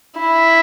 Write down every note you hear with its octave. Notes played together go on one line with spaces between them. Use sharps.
E4